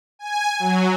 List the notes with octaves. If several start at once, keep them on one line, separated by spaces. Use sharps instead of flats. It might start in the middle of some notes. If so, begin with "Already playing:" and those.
G#5
F#3